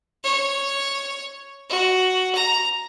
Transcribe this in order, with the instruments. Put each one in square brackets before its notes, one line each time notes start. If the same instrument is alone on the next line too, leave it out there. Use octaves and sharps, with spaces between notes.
[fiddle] C#5
F#4
A#5